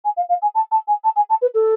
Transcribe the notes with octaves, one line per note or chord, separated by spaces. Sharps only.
G#5
F5
F5
G#5
A5
A5
G#5
A5
G#5
A5
B4
A4